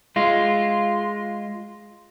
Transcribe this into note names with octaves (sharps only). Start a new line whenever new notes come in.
G#3 F4